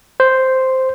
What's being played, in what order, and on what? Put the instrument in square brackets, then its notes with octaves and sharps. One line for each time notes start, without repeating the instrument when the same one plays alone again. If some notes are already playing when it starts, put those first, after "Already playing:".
[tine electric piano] C5